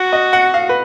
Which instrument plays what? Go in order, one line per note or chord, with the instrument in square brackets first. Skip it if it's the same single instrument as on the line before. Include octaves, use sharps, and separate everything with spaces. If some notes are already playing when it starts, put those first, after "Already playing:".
Already playing: [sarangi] F#4 [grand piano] F#5
[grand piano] D#5
F#5
F5
B4